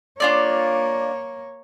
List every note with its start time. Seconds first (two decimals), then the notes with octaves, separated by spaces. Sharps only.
0.20 A#3 D4 F4 C#5 D5